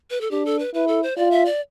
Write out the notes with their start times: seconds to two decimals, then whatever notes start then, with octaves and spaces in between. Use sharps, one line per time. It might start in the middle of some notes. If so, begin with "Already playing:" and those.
0.10 B4
0.21 A4
0.31 D4 G4
0.46 A4
0.59 B4
0.74 E4 B4
0.88 A4
1.03 C5
1.17 F4 D5
1.31 E5
1.45 D5